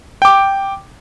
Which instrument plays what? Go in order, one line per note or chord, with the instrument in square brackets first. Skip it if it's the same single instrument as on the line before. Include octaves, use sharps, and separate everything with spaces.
[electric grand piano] G5 D6